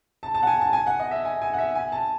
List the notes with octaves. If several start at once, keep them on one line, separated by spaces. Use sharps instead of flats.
A5
A5
F#5
G#5
A5
G#5
F#5
D#5
E5
G#5
G#5
F#5
E5
G#5
A5